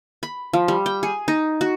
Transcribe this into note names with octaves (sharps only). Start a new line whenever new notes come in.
B5
F3
G3
G5
G#4
D#4
F#4